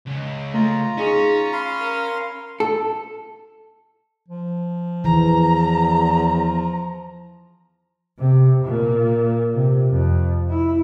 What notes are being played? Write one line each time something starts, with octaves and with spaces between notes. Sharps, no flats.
C#2
A3 F4 A#5
C#4 D#4 G#4 C#6
F5 B5 C6
A#4
A4
F3
E2 E3 A#5
C3
A#2
C3
F2
E4